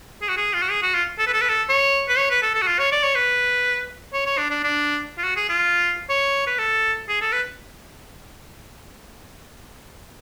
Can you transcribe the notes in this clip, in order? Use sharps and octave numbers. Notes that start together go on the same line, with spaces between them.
G#4
F#4
G#4
F4
F#4
G#4
F#4
F4
A4
B4
A4
B4
A4
C#5
B4
C#5
B4
A4
A4
F#4
F4
C#5
D5
C#5
B4
C#5
C#5
D4
D4
D4
F4
F#4
G#4
F4
C#5
B4
A4
G#4
A4
B4